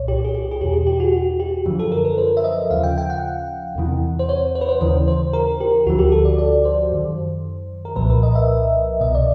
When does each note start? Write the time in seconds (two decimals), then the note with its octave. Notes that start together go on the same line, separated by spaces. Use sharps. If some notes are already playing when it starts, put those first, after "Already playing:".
Already playing: C2 A#2 C#5
0.08 G4
0.25 G#4
0.34 G4
0.51 G#4
0.61 E2 B2 G4
0.73 G#4
0.87 G4
1.00 F#4
1.13 F#4
1.40 G4
1.66 F#2 D3 F3
1.79 A4
1.92 A#4
2.05 B4
2.18 C5
2.37 E5
2.44 D#5
2.70 D#2 C#3 F3 F5
2.83 G5
2.98 G5
3.10 F#5
3.75 E2 C3 E3
4.19 C5
4.29 C#5
4.55 C5
4.61 B4
4.69 C5
4.81 D#2 C#3 E3 C5
5.08 C5
5.33 A#4
5.60 G4
5.87 D2 D3 F3 F#4
5.99 G4
6.12 A4
6.25 D5
6.38 D5
6.65 C5
6.92 F#2 D#3
7.85 A#4
7.96 C2 A#2 F3 B4
8.10 A#4
8.23 D#5
8.35 E5
9.01 C2 B2 D#5
9.15 D5